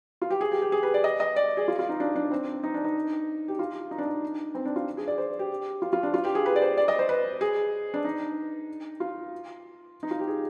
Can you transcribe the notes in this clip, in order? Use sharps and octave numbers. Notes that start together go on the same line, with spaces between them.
F4
G4
G#4
G4
G4
G#4
B4
D5
D#5
D#5
D5
G#4
F4
F4
D#4
D4
D4
C4
D#4
D4
D#4
G4
F4
D#4
D4
D#4
C4
D4
F4
G#4
D5
C5
G4
F4
F4
D4
F4
G4
G#4
B4
D5
C5
D5
D#5
C5
B4
G#4
D4
D#4
F4
D#4
F4
G4
G#4